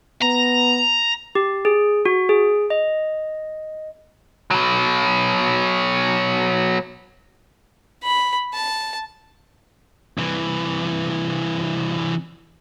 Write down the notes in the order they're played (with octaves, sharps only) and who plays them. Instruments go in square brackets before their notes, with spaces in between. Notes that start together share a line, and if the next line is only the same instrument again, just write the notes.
[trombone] B3 [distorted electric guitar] A#5
[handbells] G4
G#4
F#4
G#4
D#5
[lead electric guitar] B2 F#3
[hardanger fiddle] B5
A5
[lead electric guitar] C2 E3